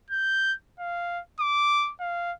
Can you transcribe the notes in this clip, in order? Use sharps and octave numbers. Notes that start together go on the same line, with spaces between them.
G6
F5
D6
F5